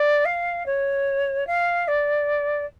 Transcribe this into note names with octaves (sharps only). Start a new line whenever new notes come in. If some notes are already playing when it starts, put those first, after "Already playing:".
Already playing: D5
F5
C#5
F5
D5